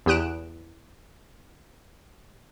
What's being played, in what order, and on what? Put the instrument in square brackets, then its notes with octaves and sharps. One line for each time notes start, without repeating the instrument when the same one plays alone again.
[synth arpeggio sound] E2 G4 D#6 F#6 D7 E7